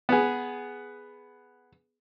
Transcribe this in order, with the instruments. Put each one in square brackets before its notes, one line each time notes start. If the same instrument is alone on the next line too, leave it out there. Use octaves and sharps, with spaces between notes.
[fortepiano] B3 G#4